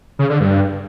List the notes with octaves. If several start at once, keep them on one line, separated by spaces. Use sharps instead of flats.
C#3
D3
G2